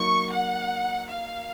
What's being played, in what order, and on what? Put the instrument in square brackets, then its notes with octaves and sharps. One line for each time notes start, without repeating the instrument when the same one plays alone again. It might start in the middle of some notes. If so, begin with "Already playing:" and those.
Already playing: [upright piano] F#3 A#3 D#4 [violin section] C#6
[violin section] F#5
F5